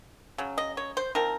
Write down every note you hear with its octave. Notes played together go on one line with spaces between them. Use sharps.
C#3 F#3
D#5
C#5
C5
F3 C4 D#4 A#4